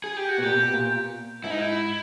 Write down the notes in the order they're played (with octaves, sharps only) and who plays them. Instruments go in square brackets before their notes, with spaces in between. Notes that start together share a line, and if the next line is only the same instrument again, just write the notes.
[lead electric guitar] G#4
G4
F#4
[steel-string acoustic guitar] B2
[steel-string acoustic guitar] A#2 [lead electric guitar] G4
[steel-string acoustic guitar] B2
A#2
[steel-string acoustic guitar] G#2 [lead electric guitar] E4
[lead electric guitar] D#4
E4